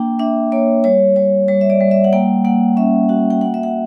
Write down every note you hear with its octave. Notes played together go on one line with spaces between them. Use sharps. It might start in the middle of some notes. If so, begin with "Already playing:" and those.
Already playing: A#3 D4 G5
D4 E5
A#3 C#5
G3 C#5
G3 C#5
G3 C#5
E5
D5
G3
E5
F#5
A#3 G5
A#3 F#5
C#4 E5
F#4 F#5
G5
A#3 F#5
E5
F#5